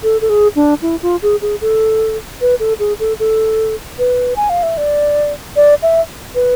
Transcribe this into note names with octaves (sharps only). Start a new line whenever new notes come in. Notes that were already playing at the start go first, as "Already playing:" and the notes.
A4
A4
G#4
D4
E4
F4
G#4
G#4
A4
B4
A4
G#4
A4
A4
B4
G#5
F5
E5
D5
D5
E5
B4